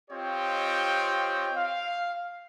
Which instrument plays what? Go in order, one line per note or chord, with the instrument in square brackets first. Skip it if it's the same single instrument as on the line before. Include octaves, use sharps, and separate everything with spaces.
[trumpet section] C4 F4 G4 C#5 D#5 G5
F5